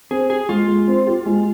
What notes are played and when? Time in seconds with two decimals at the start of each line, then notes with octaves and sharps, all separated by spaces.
0.11 C4 G#4
0.30 G4 G#4
0.49 G#3 F4
0.68 G#3
0.88 C4
1.07 G4
1.26 G#3